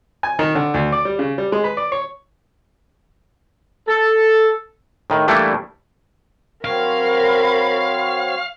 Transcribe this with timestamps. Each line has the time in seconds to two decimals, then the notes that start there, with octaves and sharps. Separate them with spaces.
0.23 G#5
0.39 D#3
0.55 D3
0.74 D2
0.92 D5
1.05 G3
1.19 C#3
1.38 G3
1.52 G#3
1.64 B4
1.77 D5
1.92 C#5
3.88 A4
5.10 A2 D#3
5.28 E3 G3 A3 A#3 D4 E4
6.65 F#3 C4 A#4 C#5 F5 B5